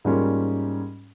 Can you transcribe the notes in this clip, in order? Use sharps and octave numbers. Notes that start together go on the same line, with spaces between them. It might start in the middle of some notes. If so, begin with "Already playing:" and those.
G#2 G3 A#3 C#4 F4